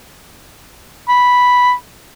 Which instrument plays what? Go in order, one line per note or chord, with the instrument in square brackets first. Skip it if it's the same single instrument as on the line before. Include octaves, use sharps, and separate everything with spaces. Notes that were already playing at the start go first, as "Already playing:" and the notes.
[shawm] B5